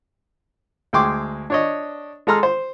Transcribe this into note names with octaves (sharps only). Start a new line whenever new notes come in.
D2 G#3 G5 C6 D6
D4 C#5 D#5
G#3 A4 A#5 C6 F6
C5